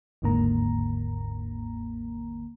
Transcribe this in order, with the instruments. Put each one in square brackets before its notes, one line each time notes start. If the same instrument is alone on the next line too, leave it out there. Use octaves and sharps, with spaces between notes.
[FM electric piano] G1 D#2 G#2 D3 A#3 A#5